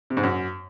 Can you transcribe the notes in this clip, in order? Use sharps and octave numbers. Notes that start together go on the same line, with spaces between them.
C3
G#2
F#2